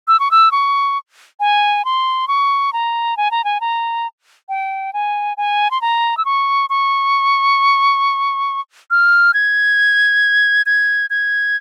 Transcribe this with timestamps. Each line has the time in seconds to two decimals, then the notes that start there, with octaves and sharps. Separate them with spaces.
0.08 E6
0.20 C#6
0.31 E6
0.52 C#6
1.40 G#5
1.85 C6
2.28 C#6
2.73 A#5
3.17 G#5
3.31 A#5
3.44 G#5
3.61 A#5
4.49 G5
4.93 G#5
5.37 G#5
5.71 C6
5.81 A#5
6.17 E6
6.25 C#6
6.70 C#6
8.91 F6
9.34 G#6
10.66 G#6
11.10 G#6